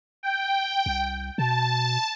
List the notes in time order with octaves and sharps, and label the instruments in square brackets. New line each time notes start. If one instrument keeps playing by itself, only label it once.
[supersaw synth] G5
[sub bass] C2
[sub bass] B2 [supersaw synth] A5